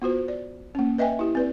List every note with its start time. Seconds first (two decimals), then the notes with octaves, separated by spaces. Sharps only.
0.02 B3 F4 F#4 C5
0.28 D5
0.75 A#3 C#4
0.98 B4 D#5 E5 G5 G#5
1.19 E4 G4
1.35 C4 B4 D5